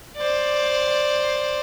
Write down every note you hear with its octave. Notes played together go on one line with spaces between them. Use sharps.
C5 D5